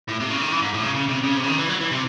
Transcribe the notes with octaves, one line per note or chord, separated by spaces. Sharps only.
A2
C3
C#3
D#3
E3
G#2
A2
C#3
C#3
C3
C#3
C3
C#3
D#3
E3
F#3
E3
C3